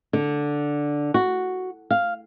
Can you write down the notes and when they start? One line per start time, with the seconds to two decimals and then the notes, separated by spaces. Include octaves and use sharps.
0.13 D3
1.14 F#4
1.90 F5